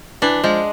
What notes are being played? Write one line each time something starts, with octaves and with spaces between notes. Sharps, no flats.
E3 D4
F3 G#3